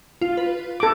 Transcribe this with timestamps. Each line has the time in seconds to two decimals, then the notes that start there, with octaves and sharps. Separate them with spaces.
0.21 F4
0.37 B4
0.80 A4 D6